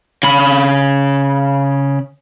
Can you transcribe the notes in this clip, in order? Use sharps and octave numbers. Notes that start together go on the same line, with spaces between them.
C#3 B5